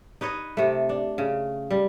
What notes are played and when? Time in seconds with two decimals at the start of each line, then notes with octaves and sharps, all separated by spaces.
0.21 D#4 B4 C#5 D#5
0.57 C3 A3
0.89 D4
1.18 C#3
1.71 G3